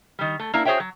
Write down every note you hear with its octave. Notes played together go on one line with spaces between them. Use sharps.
D#3 G3
A3
A#3 D4 E4
F#4 G#4 C5 C#5 E5 G5
F#3